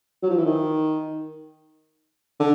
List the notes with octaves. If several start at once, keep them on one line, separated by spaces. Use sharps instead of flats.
F#3
F3
E3
D#3
D3